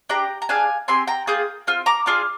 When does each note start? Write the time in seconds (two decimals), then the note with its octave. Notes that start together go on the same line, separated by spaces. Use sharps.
0.09 D4 G4 G5 A#5
0.42 A#5
0.49 D4 G#4 F5 G#5
0.88 C4 G4 G#5 C6
1.07 G5 A#5
1.27 A#3 F4 G#4 D#6 G6
1.67 C4 F4 F6
1.86 A#5 D6
2.06 D4 F4 G#4 D6 F6